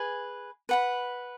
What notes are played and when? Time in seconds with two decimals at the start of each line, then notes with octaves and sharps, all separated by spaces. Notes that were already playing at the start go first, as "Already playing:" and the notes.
Already playing: G#4 B4 G#5
0.69 B4 F#5 B5